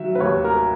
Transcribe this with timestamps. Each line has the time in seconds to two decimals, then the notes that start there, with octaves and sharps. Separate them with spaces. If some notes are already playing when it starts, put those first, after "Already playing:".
Already playing: D#3 F#3 E5
0.15 B4
0.20 D#2 C#5
0.44 A#4